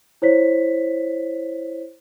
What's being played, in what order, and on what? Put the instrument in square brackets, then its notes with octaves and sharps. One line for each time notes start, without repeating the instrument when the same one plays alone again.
[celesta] E4 C5 C#5 B6